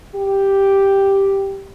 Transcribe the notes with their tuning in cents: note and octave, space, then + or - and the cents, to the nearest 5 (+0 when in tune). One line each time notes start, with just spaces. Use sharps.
G4 +0